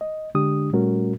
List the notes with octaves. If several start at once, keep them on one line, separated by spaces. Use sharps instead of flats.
D#5
D3 G#3 D4 G4 D#6
A#2 G3 A3 C#4 F#4 A#4